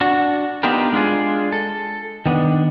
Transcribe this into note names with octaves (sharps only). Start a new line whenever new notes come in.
D4 F#4
B3 D4 D#4 F4 G4 A#4
G#3 D4 E4 F4 G#4
A4
D#3 B3 D4